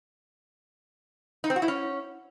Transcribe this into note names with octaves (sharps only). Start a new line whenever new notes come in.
D#4
C4
F#4
E4
C#4